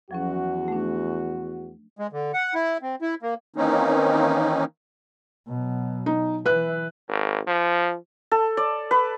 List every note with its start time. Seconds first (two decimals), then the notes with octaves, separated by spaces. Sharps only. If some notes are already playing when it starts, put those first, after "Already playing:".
0.11 E2 F3 F#3 C#4 F#4
0.68 A3 D4
1.99 G#3
2.12 D3
2.34 F#5
2.54 E4
2.82 C4
3.02 E4
3.22 A#3
3.56 D#3 E3 A#3 C4 C#4 D#4
5.48 B2 F#3
6.06 D#4
6.46 E3 B4 F#6
7.08 G#1
7.47 F3
8.31 A4
8.57 D5
8.91 B4